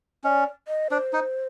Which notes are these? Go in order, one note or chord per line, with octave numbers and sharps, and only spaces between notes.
C#4 D5 D#5
D#5
D4 C5
D#4